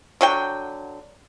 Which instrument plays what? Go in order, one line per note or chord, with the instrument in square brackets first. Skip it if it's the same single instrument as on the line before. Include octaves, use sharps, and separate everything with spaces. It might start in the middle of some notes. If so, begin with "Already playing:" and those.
[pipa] D3 F#3 G5